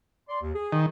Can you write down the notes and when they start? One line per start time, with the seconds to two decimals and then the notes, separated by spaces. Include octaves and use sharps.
0.28 D5 C6
0.41 D#2
0.54 G#4
0.72 D#3